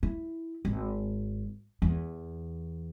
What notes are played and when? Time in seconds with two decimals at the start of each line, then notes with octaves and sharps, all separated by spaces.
0.03 E4
0.65 G#1
1.82 E2